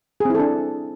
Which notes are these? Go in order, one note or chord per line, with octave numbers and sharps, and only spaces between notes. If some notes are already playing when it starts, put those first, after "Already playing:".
C4 D4 E4 G#4 A4